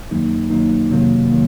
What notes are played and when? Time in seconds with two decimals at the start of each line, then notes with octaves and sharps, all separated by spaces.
0.11 F#2 D#3 F#3 A#3 D#4
0.50 F#2 D#3 F#3 A#3 D#4
0.91 F2 C3 D#3 F#3 A#3
1.30 D#3 F#3 A#3